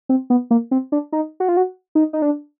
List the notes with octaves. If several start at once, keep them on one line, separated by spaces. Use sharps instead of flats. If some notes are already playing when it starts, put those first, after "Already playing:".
C4
B3
A#3
C4
D4
D#4
F#4
F4
F#4
D#4
D#4
D4